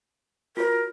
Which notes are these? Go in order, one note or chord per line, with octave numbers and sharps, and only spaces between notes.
F4 F#4 A#4 C#5